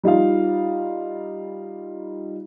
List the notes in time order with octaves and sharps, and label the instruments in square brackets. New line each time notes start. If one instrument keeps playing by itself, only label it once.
[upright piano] G3 D#4 F4 F5